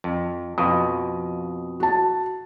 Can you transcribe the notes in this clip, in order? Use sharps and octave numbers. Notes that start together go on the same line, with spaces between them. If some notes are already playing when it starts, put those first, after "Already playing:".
F2
F2 B2 F5 D#6
F#4 A5